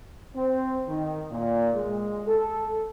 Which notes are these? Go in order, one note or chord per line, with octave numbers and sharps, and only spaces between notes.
C4
D#3
A#2
G#3
A4